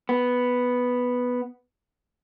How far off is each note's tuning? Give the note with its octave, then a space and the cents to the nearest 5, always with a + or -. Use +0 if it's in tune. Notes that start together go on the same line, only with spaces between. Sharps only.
B3 +0